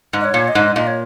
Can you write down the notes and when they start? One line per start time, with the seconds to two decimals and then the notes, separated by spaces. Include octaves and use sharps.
0.13 G#2
0.20 D#5
0.24 C#5
0.34 A#2
0.48 D#5
0.55 G#2
0.76 A#2 D#5
0.87 C#5